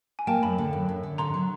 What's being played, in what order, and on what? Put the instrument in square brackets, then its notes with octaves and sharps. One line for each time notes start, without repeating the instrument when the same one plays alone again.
[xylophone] G#5
[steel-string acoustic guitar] A#3 [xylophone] G5 A5
[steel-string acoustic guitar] F#2 [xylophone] A5 B5
[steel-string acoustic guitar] D3
F#2
F#2
D3
[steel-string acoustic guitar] D3 [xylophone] A#5 C6
[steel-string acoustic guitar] F#3